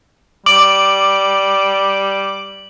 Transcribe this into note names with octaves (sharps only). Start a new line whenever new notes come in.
G3 D6 F#7